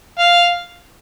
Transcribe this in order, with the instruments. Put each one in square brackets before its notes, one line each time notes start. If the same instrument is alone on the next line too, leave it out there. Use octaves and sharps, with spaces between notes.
[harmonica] F5